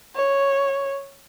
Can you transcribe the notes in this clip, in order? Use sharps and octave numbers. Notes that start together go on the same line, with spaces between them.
C#5